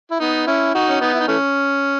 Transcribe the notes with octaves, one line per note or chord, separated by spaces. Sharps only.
E4
B3 D#4
C#4 E4
D#4 F#4
C#4
B3 D#4
E4
D#4
E3 A3 C#4